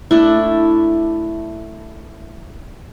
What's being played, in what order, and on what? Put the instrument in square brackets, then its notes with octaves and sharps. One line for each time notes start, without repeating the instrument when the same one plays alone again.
[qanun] A3 D4 E4